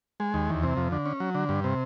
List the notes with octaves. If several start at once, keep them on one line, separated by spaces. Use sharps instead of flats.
G#3
D#2
E2
C3
F2
D3
C#4
F#3
D3
G2
C3